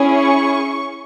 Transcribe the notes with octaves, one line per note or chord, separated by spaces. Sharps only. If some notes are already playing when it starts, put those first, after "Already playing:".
Already playing: C#4 E4 G#4
C#6